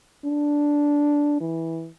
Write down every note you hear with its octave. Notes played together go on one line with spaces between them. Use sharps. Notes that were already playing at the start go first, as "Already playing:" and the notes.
D4
E3